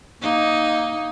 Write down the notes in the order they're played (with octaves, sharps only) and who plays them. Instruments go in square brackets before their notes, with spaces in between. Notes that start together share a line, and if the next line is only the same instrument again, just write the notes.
[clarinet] A#3 [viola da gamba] D#4